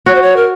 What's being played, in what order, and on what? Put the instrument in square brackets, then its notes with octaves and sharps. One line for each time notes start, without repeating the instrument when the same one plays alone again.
[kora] F#4 [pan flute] C#5
[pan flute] C5
C#5
A#4